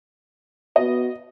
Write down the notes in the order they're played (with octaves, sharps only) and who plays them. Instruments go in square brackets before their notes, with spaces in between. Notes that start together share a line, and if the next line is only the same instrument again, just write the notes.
[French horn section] B3 F#4 [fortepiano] D#5